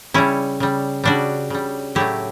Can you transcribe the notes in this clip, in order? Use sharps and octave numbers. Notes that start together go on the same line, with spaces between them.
C#3 G3 C#4 E4
C#3 G3
C#3 G3 D4 F#4
C#3 G3
A2 F#3 A3 E4 G4